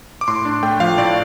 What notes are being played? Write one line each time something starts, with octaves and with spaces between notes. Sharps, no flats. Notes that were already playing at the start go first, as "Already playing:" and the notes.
D6
A2 C6
D4
A3 G5
F3 F5
A2 D5